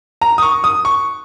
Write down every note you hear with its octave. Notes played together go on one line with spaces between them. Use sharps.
A#5
D#6
C#6
D#6
C#6